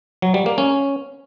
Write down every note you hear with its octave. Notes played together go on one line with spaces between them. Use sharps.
F#3
G3
A#3
C#4